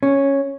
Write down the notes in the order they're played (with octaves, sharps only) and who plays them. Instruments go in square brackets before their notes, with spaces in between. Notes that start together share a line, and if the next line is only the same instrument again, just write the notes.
[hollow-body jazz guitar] C#4